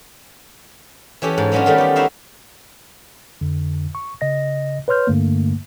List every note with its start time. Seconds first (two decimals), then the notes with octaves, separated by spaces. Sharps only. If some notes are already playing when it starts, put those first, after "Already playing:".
1.22 E3 C#4 G4 A4
1.38 G#2
1.52 F#3 G#3 B3 C#4 D4 F4
1.66 D#3 G3 A3 A#4
1.78 B3 G4
1.96 D#4 E4 F#4 E5 F5
3.41 F2 D3
3.95 C#6
4.21 C#3 D#5 A#6
4.88 B4 C#5 C6 F6 G6
5.07 G2 D3 A3 A#3